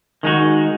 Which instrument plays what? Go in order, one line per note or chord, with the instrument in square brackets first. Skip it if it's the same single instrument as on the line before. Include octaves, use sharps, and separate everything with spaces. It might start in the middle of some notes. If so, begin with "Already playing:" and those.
[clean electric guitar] D#3 G#3 D#4 F#4